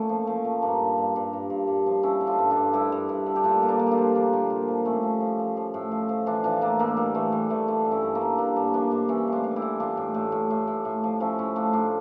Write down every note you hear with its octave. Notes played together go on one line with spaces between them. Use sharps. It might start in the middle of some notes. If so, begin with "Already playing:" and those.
Already playing: A#2 A3 C#4
F3
F3
A#2
G2 A#3 D4
G2
G2
G2
G2
G2
G2
F3
F3 C#4 E4
D3
D4 F4
G2
D4 F4
G2
G2 E4 G4
G2
G2
D3
G4
A#2 D4 F4
A#2
A#3 D4
A#2
D4 F4 G4
F3
F3 A#3 D4
A#2
A#2
F3
A2 A3 C#4
F3
F3
F3
F3
A2
F3
F3
E3 D4 F4
E3 D4 F4
A2 A#3 D4
A2 A#3 D4
E3 G3 A#3
E3 A3
E3 G3
E3 A3
D3 D4 F4
G2
C#4 E4
G2
A#3 D4
G2
D3 A#3 D4
G2 A#3 D4
C#4
F3 A#3 D4
G2 D4 F4
E3 C#4 E4
A2
D4 F4
E3
E4 G4
E3
E3 D4 F4
A2
A2
A2
A2
A2
A2
F3
F3 C#4 E4
A2 C#4 E4
A2 D4 F4
A2 D4 F4